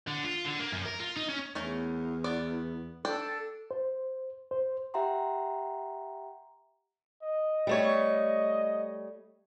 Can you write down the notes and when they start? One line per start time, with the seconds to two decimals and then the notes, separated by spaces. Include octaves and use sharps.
0.08 D3
0.25 F4
0.45 D3
0.60 A#3
0.72 F#2
0.86 A#4
1.00 F4
1.17 D#4
1.29 C#4
1.55 E2 A3 C#4 A#4
2.24 B3 D5
3.05 D4 A4 D5 G5
3.71 C5
4.51 C5
4.94 G4 E5 F#5 G5 A#5 C6
7.23 D#5
7.67 G3 A3 C#5